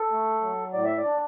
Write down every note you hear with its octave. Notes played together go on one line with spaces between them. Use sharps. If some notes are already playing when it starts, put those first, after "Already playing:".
Already playing: A4
A3
F#3
A2 D5
E5
D5
D4